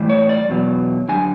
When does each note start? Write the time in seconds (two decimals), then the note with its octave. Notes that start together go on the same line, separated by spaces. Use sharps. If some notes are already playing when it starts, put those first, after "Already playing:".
Already playing: A2 E3 G3
0.09 C#5
0.29 D5
0.49 E2 B2 F#3
1.08 F#2 D3 G3 G#5